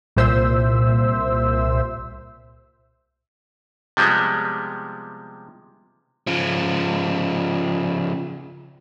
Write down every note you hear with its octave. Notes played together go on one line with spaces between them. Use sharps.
C2 A#2 C5 E5 E6
C3 F3 G3 G#3 B3
C#3 F3